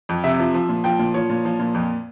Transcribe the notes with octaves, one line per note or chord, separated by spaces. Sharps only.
F2
C3 E5
F3
F3
A#2
F3 G5
A#2
F3 C#5
A#2
F3
A#2
F2